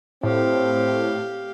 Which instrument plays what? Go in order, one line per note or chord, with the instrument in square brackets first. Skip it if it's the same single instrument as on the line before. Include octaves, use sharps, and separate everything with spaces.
[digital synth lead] A2 [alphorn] C4 [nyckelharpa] G4 F5